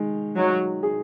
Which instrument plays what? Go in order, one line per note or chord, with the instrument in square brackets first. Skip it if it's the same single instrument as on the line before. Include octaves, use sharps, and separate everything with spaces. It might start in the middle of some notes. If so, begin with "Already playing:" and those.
Already playing: [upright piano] D#3 G#3
[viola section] F#3 [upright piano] D#4
[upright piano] G#4